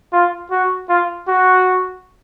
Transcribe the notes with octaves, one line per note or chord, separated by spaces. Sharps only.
F4
F#4
F4
F#4